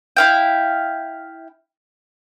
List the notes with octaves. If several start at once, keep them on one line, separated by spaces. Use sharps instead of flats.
E4 F5 G5